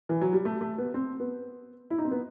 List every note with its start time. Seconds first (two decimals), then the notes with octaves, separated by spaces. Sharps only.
0.09 E3
0.21 F#3
0.33 G3
0.45 A3
0.61 A3
0.78 B3
0.94 C4
1.20 B3
1.90 E4
1.98 D#4
2.05 C4
2.11 B3